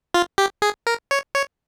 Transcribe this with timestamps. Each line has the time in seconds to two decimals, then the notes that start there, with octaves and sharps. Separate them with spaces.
0.14 F4
0.38 G4
0.62 G#4
0.87 A#4
1.11 C#5
1.35 C#5